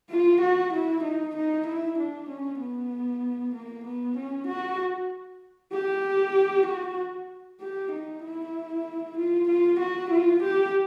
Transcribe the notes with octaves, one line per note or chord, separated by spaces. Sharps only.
F4
F#4
E4
D#4
D#4
E4
D4
C#4
B3
A#3
B3
C#4
F#4
G4
F#4
G4
D#4
E4
F4
F4
F#4
F4
G4